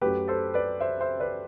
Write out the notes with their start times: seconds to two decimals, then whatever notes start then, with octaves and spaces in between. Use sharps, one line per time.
0.01 F#2 F#3 A3 G4 B4
0.28 A4 C5
0.54 B4 D5
0.80 C5 E5
1.01 C5 E5
1.20 B4 D5